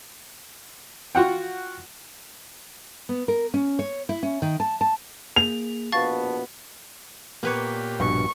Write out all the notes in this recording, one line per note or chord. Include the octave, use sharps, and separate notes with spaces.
F4 F#4 F#5 G5
B3
A#4
C#4
C#5
E4
C#4
D#3
A5
A5
A#3 G#4 F7
A#1 B2 B3 F5 A5 C#6 A6
A#2 A#3 B3 G4 B4 C#5
A#1 G2 B2 C#6